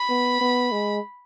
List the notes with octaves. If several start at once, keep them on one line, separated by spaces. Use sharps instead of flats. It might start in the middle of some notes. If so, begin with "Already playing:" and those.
Already playing: B5
B3
B3
G#3